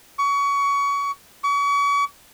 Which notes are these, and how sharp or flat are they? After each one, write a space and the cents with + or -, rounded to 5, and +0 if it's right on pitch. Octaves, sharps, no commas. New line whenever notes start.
C#6 +25
C#6 +40